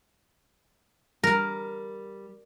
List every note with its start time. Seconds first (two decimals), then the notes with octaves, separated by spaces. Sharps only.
1.24 G3 A#4